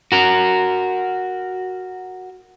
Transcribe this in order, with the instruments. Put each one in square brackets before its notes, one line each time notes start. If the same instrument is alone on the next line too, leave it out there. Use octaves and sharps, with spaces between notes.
[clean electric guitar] F#4 A#4